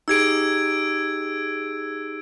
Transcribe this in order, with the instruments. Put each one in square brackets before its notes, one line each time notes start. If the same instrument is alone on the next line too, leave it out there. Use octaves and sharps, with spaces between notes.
[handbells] D#4 G4 G#4 [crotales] E6 G#6 D7